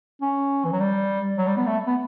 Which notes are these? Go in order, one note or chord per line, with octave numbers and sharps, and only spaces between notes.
C#4
E3
F#3
G3
F#3
G3
B3
A3
B3